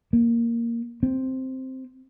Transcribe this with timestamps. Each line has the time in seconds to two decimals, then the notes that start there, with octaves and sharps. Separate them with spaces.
0.13 A#3
1.03 C4